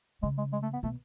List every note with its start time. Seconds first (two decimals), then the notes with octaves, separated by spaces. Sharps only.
0.23 C#3 G#3
0.38 G#3
0.53 G#3
0.63 A3
0.73 B3
0.83 B2 A3